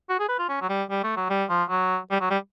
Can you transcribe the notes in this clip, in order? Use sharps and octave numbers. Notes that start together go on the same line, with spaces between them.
F#4
G#4
B4
F4
C#4
F#3
G3
G3
A3
F#3
G3
F3
F#3
G3
F#3
G3